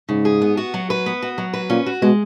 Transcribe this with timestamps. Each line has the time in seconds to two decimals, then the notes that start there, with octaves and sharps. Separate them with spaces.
0.09 G#2 C#3
0.25 G#4
0.41 B3
0.57 F#4
0.74 F#3
0.90 B4
1.06 B3
1.22 F#4
1.38 F#3
1.53 B4
1.70 A#2 C#4
1.86 F#4
2.02 B2 G#3